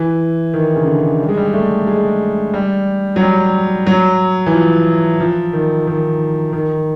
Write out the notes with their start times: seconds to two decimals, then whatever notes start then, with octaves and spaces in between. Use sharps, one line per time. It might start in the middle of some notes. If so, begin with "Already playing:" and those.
Already playing: E3
0.54 D#3
0.76 C#3
0.87 D3
1.21 G3
1.29 G#3
1.37 G3
1.54 A3
1.87 G#3
2.54 G3
3.16 F#3
3.20 G3
3.87 F#3
4.46 E3
4.53 F3
5.20 F3
5.53 D#3
5.87 D#3
6.53 D#3